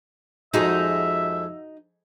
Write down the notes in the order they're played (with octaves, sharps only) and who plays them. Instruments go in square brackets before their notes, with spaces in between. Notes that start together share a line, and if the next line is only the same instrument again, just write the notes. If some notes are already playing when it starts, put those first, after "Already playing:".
[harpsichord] F2 G#3 [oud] D#4 F#4 G#4 [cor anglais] E5